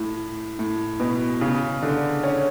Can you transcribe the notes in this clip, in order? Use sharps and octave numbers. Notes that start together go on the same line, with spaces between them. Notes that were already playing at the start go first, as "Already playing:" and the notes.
Already playing: A2
A2
B2
C#3
D3
C#4